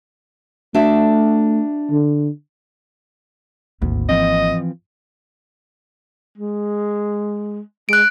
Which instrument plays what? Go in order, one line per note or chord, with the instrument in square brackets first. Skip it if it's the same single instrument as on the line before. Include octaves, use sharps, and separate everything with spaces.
[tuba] A3 [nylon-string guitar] D4 F#4 E5
[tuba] D3
[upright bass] G#1 A#3 [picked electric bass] D2
[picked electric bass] E3 F3 C4 [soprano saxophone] D#5
[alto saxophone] G#3
[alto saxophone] G#3 [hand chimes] F#6 D7